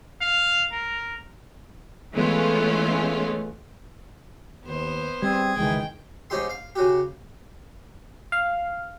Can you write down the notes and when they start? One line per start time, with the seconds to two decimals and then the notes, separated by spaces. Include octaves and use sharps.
0.21 F5
0.72 A#4
2.14 E3 G#3 A3 B3 C#4 F4
4.65 D#2 B3 C5
5.22 G3 C4 G#4
5.57 F1 C#2 D#3 E3 G#3 G5
6.30 G#2 C#4 D#4 G4 G#4 C6
6.50 F5
6.75 C#3 F#4 G4
8.32 F5